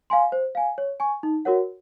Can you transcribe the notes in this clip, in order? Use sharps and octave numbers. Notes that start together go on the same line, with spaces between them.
F5 G#5 C6
C5
F5 G#5
C#5
G#5 C#6
D#4
F#4 A#4 C#5 F#5